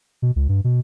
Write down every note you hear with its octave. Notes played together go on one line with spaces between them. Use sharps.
B2
C#2
G2
B2